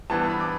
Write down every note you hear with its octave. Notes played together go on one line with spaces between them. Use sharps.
G2 E3 B3 D4 A5
A5
B5
D6